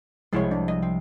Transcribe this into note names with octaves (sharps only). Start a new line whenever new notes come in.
C2 F3 G#3 E4 C5 C#5
D4
D#5
C4